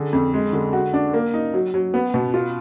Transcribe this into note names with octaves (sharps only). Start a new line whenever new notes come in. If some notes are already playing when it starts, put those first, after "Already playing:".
Already playing: D3 G#4
F2
G#3
D3
F#4
D4
A#3
D#4
F#3
F#3
B3
B2
F4